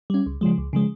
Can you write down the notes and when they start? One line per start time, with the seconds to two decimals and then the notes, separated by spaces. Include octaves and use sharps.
0.10 G3 C#4
0.26 C#2
0.41 C#3 F3 G#3
0.58 C#2
0.73 C#3 F3 G#3